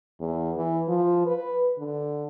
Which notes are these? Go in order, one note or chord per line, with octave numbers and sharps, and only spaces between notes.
E2
E3
F3
B4
D3